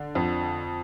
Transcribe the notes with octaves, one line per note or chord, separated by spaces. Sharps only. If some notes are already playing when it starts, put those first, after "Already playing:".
Already playing: D3
F2